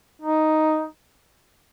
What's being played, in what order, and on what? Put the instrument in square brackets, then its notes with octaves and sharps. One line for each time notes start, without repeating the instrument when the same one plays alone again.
[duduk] D#4